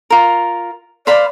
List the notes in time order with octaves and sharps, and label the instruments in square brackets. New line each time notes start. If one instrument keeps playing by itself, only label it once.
[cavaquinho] F4 A#4
[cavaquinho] C5 F5 B5 [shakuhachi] D5